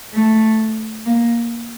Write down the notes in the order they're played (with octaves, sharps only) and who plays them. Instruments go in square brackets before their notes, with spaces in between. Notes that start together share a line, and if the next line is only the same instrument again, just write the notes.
[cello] A3
A#3